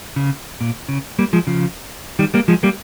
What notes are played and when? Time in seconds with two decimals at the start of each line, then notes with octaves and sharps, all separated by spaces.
0.16 C#3
0.61 A#2
0.89 C#3
1.19 G3 A#3
1.33 F3 G#3
1.47 C#3 F3
2.19 D#3 G3
2.34 G3 A#3
2.48 F3 G#3
2.63 G3 A#3